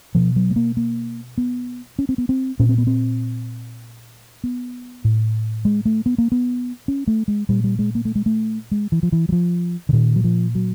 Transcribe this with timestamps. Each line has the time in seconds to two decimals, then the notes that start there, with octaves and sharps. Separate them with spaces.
0.15 B2 F3
0.36 F#3
0.50 A3
0.56 A#3
0.77 A#3
1.38 B3
1.99 C#4
2.09 C4
2.18 B3
2.29 C4
2.59 A#2 C#4
2.69 C4
2.78 B3
2.87 C4
4.44 B3
5.05 A2
5.65 G#3
5.85 A3
6.06 B3
6.18 A#3
6.32 B3
6.88 C#4
7.07 A3
7.28 G#3
7.49 A#2 G3
7.64 G3
7.79 G#3
7.95 A#3
8.05 A3
8.15 G#3
8.26 A3
8.71 G#3
8.92 E3
9.03 F3
9.12 E3
9.29 F#3
9.32 F3
9.89 D3
9.93 A#2 D#3
10.16 F#3
10.24 F3
10.55 F#3